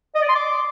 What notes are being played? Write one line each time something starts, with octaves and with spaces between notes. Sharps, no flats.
D#5
D5
C6
D6